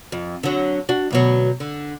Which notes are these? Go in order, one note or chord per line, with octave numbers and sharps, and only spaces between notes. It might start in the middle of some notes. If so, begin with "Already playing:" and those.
F2
D3 F#3
D4 F#4
D2 B2 F#3
D3